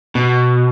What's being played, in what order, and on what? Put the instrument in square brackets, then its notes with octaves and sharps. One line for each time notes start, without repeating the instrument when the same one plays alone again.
[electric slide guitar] B2